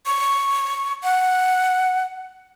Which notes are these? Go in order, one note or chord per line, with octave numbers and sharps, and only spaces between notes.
C#6
F#5